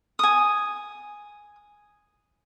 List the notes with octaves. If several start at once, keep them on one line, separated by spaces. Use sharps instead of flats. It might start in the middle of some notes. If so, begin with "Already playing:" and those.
G#5 D#6